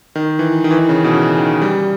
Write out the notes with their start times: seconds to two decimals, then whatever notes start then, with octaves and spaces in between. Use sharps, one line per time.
0.15 D#3
0.39 E3
0.64 D#3
0.71 E3
0.79 D#3
0.89 C#3
1.04 B2
1.13 C#3
1.38 D#3
1.62 G3